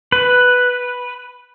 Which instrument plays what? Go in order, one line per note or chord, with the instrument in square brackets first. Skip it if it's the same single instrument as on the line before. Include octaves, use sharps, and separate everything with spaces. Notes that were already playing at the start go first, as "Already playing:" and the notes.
[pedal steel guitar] B4